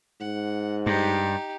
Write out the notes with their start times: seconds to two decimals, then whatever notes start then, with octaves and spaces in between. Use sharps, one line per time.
0.21 G#2 F#5
0.86 G2 D#4 G4